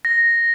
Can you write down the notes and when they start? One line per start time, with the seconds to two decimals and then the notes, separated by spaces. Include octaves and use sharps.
0.05 A#6